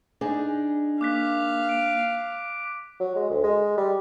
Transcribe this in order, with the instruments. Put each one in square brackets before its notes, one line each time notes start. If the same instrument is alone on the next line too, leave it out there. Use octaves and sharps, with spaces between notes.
[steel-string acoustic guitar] D4 D#4 G#4
[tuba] A#3 [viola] F5 [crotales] D6 F#6 B6
[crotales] D7
[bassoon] F#3
G#3
D2
G#3
G3